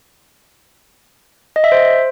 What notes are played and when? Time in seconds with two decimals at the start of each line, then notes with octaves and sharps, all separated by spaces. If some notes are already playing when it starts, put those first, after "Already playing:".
1.56 D#5
1.64 E5
1.72 C5